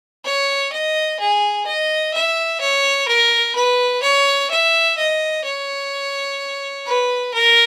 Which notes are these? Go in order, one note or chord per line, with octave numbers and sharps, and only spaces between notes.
C#5
D#5
G#4
D#5
E5
C#5
A#4
B4
C#5
E5
D#5
C#5
B4
A#4